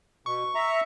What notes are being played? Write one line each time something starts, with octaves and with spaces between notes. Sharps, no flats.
B2 C#6
E5 A#5